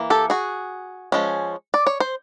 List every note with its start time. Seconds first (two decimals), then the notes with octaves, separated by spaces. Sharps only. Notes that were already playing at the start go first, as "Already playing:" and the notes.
Already playing: E3 A#3
0.10 G4 A4
0.30 F#4 G#4
1.12 F3 G#3 C#4
1.74 D5
1.87 C#5
2.00 C5